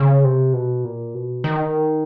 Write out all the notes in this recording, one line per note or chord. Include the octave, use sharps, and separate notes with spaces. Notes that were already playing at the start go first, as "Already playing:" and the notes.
Already playing: C#3
C3
B2
A#2
B2
D#3